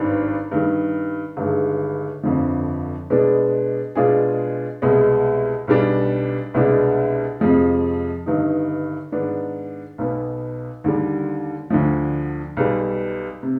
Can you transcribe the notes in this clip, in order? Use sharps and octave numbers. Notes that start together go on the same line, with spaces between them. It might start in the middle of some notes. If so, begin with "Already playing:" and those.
Already playing: G#1 G2 D#3 B3 D4
G2 D#3 G3
G1 G2 D#3 G#3
G1 F2 D3 F3
B2 G#3 B3 D4
B2 G#3 D4 F4 G#4
C2 B2 G#3 B3
B1 B2 G3 D4
C2 B2 G#3 D4
F2 C3 F3 G#3
G1 G2 D#3 B3 D#4
G#2 D#3 B3 D4
B1 B2 B3
D#2 D3 G3
D2 D3 F3
B1 B2 G3
C3